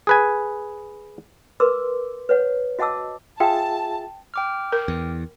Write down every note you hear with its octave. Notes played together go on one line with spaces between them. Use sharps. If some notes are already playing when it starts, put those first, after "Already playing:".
G#4 B4 G#5
A#4 B4 C6 D6 E6
B4 C#5 F#5
F#4 D#5 F#5 A5 D6 E6
F4 G#4 E5 G5 A5
G5 D6 F6
A#4
E2